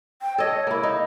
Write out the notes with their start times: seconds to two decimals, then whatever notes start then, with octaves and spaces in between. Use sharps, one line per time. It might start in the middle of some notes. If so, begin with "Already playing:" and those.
0.22 G5
0.38 A4 C#5 D#5
0.67 A#3 E4
0.83 D#4